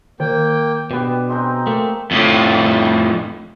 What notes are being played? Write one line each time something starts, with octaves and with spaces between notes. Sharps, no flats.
D#3 A#3 G5
B2 B3 D4 G4
G#3 C4 D#4
A3 A#3
F2 A2